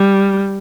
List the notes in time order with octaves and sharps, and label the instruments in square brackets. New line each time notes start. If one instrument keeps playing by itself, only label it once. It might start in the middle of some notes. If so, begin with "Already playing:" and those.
Already playing: [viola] G3